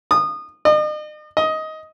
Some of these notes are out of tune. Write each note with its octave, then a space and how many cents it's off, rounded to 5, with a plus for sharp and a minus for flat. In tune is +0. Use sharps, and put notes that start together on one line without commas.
D#6 -25
D#5 -40
D#5 +15